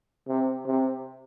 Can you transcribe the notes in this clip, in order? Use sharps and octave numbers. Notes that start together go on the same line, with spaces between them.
C3
C3